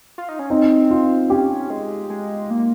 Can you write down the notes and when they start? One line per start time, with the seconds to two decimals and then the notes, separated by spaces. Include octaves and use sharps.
0.18 F4
0.29 D#4
0.39 C#4
0.50 C4 D#4
0.91 F4
1.30 C#4 G4
1.70 G#3
2.10 G#3
2.50 A#3